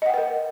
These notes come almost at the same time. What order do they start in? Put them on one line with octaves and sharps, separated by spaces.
D#5 F#5 G5 B4 A#4